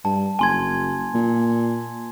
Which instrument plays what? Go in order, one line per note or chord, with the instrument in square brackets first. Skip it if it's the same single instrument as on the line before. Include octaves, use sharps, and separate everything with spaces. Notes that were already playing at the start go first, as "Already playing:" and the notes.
[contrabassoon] G2 [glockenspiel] A5
[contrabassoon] F#1 [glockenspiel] G#5 C6 G#6
[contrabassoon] A#2